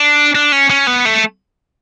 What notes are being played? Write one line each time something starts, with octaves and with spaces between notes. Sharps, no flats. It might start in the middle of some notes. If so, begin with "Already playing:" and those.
Already playing: D4
D4
C#4
C#4
B3
A3